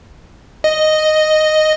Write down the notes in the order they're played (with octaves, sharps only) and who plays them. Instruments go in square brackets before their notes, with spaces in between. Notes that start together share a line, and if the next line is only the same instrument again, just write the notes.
[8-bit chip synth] D#5